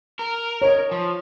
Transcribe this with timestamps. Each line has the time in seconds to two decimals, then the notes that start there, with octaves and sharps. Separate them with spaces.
0.19 A#4
0.62 C#5 D#5
0.91 F3